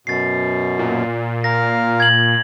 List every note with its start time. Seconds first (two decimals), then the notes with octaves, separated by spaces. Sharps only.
0.07 F#2 B2 A6 C7
0.79 A#2
1.44 A#4 F5 A#6
2.00 G#6 F#7